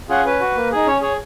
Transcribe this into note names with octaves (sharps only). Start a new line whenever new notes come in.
C#4 F4 G#4 F#5
C#4 B4
F#4
A#3
D#4 G#4
C#4 C#5
G#4 C#5